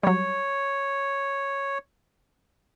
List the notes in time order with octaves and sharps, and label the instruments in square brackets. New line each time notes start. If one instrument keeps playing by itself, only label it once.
[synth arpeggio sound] F#3 G3 [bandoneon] C#5